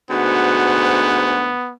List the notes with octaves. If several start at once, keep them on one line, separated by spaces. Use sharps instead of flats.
D2 G#2 B3 F#4